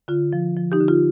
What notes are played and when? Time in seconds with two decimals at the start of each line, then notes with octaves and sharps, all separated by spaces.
0.08 D3 F4
0.33 F3
0.57 F3
0.72 D#4 G4
0.81 D3
0.88 F4